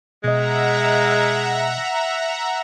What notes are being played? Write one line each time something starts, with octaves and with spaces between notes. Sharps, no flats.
B2 G#3 D#5 E5 F#5 A#5